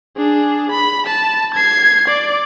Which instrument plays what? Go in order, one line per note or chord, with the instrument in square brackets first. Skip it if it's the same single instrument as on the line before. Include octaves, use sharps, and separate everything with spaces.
[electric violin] D4 G#4
B5
A5
G#6 C7
D5